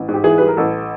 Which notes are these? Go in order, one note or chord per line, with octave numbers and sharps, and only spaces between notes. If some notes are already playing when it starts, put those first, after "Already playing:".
Already playing: A1
G#2
G4
E3 G#4
G3 B4
A#4
A1 A4